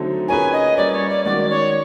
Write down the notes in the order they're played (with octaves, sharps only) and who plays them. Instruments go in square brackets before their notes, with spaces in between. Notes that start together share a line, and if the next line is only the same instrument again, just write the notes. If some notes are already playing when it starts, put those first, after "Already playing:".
Already playing: [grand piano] D3 F#3 A3 C4 D#4
[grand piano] A#3 C#4 F4 G#4 B4 [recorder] G#5
[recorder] D#5
[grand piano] G3 A#3 C#4 [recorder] D5
[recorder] C#5
D5
[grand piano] D#3 G#3 C#4 F#4 [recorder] D5
[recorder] C#5